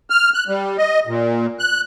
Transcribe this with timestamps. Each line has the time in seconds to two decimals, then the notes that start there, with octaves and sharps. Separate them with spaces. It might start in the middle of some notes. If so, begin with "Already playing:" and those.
0.10 F6
0.34 F#6
0.48 G3
0.78 D#5
1.07 A#2
1.59 F#6